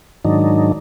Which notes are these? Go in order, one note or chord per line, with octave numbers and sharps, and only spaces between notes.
G#2 D#3 F#3 D4 D#4